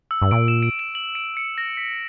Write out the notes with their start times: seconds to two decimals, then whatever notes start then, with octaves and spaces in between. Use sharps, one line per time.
0.11 E6
0.22 G2
0.31 A#2 D7
0.48 E7
0.63 D7
0.79 E7
0.95 F#7
1.15 D7
1.37 C#7
1.58 A#6
1.77 B6